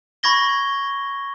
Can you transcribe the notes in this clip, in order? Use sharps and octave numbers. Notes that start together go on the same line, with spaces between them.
B5 C#6 G#6 A#6 G7